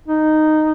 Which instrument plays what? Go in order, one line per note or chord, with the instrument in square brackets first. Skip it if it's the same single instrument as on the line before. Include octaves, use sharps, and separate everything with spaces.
[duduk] D#4